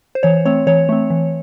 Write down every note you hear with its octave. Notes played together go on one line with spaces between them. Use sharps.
C5
E3 C#5
A3 C4 C#5
E3 C#5
A3 C4
E3